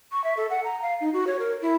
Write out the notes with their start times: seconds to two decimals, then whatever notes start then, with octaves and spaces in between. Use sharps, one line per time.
0.12 C#6
0.24 E5
0.37 A4
0.50 F#5
0.64 A#5
0.82 F5
1.01 D#4
1.13 F#4
1.27 C#5
1.39 A#4
1.62 E4